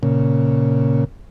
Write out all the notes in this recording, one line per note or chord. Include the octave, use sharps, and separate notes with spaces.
A#2 C#3